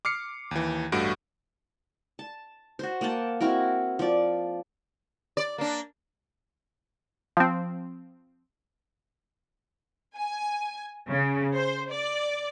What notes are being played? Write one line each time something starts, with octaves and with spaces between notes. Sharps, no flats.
D6 F6 C7 C#7
D#2 E3
A1 G2 A3 F#4 D7
A5
F#4 C5
A#3 F#5 G5 A5
C4 E4 F#4 A#4
F3 D5
D5
A#3 D4
F3 C4
G#5
C#3
C5
D5